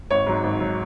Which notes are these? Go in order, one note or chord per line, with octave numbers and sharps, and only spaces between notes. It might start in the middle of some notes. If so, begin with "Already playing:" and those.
G#1 C#5
G#2 F#3
G#1
F#3